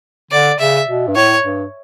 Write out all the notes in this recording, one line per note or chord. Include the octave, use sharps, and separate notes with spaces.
D3 D5
C#3 E5
B2
G2
A2 C#5
G2